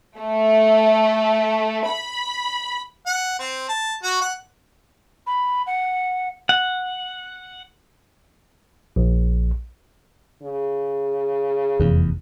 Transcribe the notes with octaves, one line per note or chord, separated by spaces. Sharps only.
A3
B5
F#5
C4
A5
F#4
F#5
B5
F#5
F#5
A#1
C#3
F1 E2